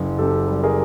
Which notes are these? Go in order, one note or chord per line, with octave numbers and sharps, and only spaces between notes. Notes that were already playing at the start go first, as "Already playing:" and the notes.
Already playing: F#1
F#2 G4 A4
G3
G#4 A#4